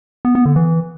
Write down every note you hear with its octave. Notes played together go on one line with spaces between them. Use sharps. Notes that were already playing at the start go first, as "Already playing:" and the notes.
B3
B3
D3
E3